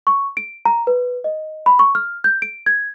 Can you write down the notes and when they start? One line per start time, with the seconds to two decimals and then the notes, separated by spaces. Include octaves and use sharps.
0.07 C#6
0.37 D7
0.65 A#5
0.87 B4
1.24 D#5
1.66 B5
1.79 C#6
1.95 F6
2.24 G6
2.42 D7
2.66 G#6